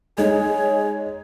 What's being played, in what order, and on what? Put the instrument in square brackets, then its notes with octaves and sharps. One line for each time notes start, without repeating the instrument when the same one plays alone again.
[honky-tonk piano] G#3 D#4 [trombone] G#4 [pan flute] C#5